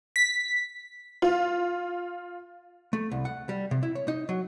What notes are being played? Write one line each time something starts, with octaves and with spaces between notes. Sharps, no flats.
B6
F4
A3
C2
F#5
G3
C3
E4
C#5
D#4
F#3